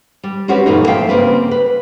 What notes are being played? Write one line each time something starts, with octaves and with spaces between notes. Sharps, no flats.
G3
C4 C#4 F#4 G4 B4
F#2 A#2 E3 A3 A#3 D#4
F3 A3 F5 G5
C#3 G3 A#3 C4 B4
B4